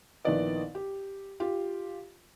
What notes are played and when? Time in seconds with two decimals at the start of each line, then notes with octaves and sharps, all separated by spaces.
0.25 A#1 D#3 B3 E4 D5 D#5
0.75 G4
1.40 F4 G4